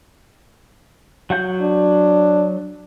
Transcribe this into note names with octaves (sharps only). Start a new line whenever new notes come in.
F#3 F#5 G6
D4